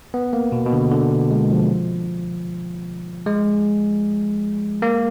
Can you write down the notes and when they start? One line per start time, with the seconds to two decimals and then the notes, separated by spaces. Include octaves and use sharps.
0.14 B3
0.33 A#3
0.52 B2
0.66 B2
0.73 D3
0.91 D3
1.31 G#3
1.50 F3
3.26 G#3
4.82 A#3